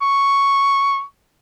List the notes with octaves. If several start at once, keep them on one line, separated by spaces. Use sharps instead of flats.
C#6